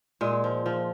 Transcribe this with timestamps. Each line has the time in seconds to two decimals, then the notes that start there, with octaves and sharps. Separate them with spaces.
0.21 A#2 G#3
0.44 F3
0.66 F3